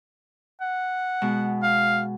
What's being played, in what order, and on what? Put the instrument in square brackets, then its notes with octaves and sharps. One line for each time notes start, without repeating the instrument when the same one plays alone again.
[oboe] F#5
[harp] B2 G#3
[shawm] F5